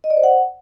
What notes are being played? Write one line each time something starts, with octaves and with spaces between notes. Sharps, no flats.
D#5
D5
C5
F#5